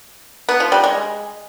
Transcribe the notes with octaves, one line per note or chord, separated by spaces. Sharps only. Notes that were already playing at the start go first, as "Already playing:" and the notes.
B3
F3
G3
G#3